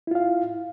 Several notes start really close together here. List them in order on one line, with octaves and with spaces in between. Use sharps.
E4 F4 F5